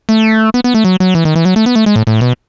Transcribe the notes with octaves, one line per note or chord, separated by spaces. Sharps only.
A3
B3
B3
A3
F#3
F#3
E3
D#3
E3
F#3
A3
B3
A3
G#3
A2
A2
B2